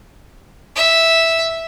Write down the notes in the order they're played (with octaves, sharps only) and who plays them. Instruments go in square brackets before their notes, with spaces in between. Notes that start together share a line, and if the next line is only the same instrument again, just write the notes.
[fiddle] E5